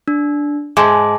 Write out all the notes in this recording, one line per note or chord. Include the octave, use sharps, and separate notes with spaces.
D4
G#2 G#3 A5 D6